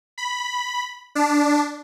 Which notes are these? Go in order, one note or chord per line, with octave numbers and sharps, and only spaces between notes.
B5
D4